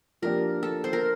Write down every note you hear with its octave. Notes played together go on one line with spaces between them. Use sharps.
F3 A#3 D4 G4 A#4
A4
C5
A#4